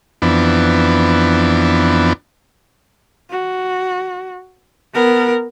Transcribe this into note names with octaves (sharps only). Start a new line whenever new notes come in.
F2 E3 B3 D4
F#4
B3 A#4